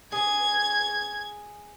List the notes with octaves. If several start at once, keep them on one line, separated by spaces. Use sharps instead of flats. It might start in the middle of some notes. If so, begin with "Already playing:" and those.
G#4 G#6